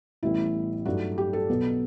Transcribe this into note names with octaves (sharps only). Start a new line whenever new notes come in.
A1 A2 E3 G3 B3 E4
G2 F#3 A3 D#4 F#4
G4
A4
B1 B2 F#3 B3